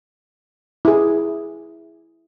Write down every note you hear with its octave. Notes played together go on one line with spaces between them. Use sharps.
E4 G#4